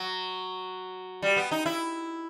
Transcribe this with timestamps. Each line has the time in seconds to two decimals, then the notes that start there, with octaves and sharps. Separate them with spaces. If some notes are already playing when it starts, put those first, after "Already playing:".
Already playing: F#3
1.22 G3
1.36 B3
1.51 D#4
1.66 E4